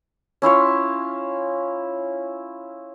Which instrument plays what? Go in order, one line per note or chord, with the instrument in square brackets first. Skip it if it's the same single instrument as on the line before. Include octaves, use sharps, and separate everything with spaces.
[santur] C#4 E4 F4 C#5